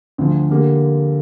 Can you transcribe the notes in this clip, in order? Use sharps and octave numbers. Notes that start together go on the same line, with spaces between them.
D2 D3 F3
D3 A#3 G4